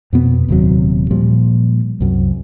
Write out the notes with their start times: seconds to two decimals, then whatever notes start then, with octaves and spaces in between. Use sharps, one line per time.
0.13 F2 B2 B3
0.48 D#1 D#2 C3 F#3
1.11 A#2 F3 G3
2.00 C2 F#2